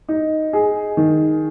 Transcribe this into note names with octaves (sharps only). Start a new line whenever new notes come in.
D#4
G#4
D#3